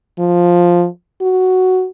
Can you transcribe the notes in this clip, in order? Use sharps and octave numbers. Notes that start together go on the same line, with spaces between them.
F3
F#4